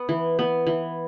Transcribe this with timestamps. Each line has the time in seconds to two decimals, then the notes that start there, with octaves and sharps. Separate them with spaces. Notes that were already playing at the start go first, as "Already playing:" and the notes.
Already playing: B3
0.09 E3
0.39 B3
0.67 E3